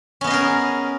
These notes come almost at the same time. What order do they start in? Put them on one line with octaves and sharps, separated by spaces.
C#4 B3 D#5 G#4 A#4